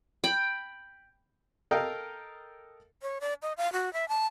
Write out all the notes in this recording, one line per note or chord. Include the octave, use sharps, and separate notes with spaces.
G5 B5
A4 A#4 D#5 F5 G5
C#5
D5
D#5
F5
F#4
E5
A5